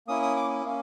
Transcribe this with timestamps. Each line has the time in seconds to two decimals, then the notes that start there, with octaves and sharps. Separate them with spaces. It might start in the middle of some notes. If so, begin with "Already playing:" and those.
0.07 A#3 C#4 E4 D#6
0.23 D#6
0.36 D6
0.65 A#3 C#4